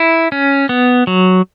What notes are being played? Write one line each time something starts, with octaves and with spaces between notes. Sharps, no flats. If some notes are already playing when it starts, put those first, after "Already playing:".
Already playing: E4
C#4
B3
F#3